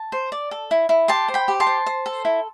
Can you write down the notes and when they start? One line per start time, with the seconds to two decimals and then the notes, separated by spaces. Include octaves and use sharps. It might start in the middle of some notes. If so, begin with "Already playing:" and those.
Already playing: A5
0.12 C5
0.32 D5
0.51 A4
0.71 E4
0.89 E4
1.08 G4 A5 C6
1.28 C5
1.34 G5 B5
1.48 G4
1.60 A5 C6
1.67 C5
1.86 C5
2.06 A4
2.25 E4